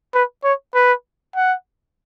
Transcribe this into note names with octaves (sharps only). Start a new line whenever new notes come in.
B4
C#5
B4
F#5